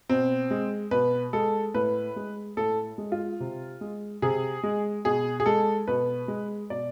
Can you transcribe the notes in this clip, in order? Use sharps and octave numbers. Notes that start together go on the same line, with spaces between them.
B2 C4
G#3
B2 B4
G#3 A4
A2 B4
G#3
A2 A4
G#3
F4
C3
G#3
C3 G#4
G#3
B2 G#4
G#4
G#3 A4
B2 B4
G#3
B2 D5